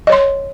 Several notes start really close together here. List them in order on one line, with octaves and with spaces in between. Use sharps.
D#5 C#5 C6